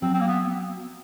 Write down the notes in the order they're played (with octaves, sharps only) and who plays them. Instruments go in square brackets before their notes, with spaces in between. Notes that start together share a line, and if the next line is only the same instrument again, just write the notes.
[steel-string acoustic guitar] F#3 [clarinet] C4
[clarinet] C4
A#3
B3